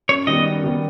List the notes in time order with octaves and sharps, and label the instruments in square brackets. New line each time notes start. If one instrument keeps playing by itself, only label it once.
[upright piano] F#2 [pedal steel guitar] C#5
[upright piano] D#3 G3 B3 [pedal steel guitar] D#5
[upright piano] F#2
D#3 G3 B3